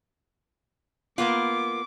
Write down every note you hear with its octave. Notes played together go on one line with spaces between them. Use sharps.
A#3 B3 F4 D6